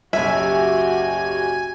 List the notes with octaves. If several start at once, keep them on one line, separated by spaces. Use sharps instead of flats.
F#1 B1 F#4 G4 E5 G#5